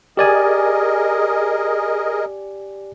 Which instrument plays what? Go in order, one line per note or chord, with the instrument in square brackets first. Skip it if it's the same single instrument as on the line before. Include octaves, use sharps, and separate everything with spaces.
[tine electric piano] G4 D5 G#5 [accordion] G#4 A#4 D#5